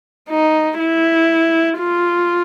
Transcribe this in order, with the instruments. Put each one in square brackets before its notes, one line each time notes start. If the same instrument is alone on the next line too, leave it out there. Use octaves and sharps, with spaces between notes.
[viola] D#4
E4
F4